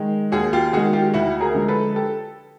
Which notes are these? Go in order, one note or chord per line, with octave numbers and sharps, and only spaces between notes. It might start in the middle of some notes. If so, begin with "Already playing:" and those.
Already playing: D#3 G#3
D#2 F#4 G#4
F4 G4
D#3 G#3 F#4 G#4
F4 G4
D2 E4 F#4
G#4 A#4
D3 F3 G#3
A4 B4
G4 A4